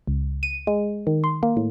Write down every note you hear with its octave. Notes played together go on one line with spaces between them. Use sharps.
C#2
D#7
G#3
D#3
C6
A#3
A2